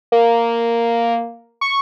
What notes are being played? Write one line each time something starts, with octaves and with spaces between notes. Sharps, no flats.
A#3
C#6